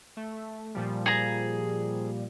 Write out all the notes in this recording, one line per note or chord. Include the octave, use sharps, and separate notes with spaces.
A3
A#2 F3 G3
G#4 A#5